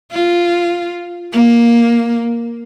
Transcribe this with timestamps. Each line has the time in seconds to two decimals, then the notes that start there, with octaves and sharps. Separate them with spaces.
0.12 F4
1.33 A#3